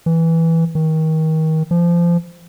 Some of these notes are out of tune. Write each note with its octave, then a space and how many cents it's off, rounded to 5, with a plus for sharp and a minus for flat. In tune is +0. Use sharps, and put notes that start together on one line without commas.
E3 -5
D#3 +30
F3 -25